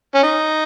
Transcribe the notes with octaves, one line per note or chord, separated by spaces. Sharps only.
C#4
D#4